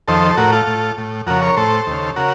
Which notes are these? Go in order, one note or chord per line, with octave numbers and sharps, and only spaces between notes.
F2 D#3 A4 C5
A4
A2 F#4 A#4
F4 A4
A2
A2
F2 C#3 F#4 A#4
A#4 C#5
A2 A4 C5
D#2 C#3
C#3 F#4 A#4